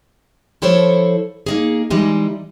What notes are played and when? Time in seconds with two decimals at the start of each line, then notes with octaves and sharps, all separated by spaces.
0.62 F3 E4 A4 C5 C#5
1.46 A#3 D#4 G#4
1.90 E3 G3 G#3 D#4